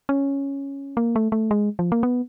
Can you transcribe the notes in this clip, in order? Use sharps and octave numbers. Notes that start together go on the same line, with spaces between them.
C#4
A#3
A3
A3
G#3
F3
A#3
B3